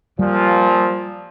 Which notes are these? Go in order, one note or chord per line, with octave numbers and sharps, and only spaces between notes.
A#2 F3 G3